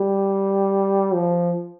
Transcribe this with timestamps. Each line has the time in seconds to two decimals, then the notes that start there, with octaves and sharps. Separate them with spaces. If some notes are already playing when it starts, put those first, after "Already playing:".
Already playing: G3
1.13 F3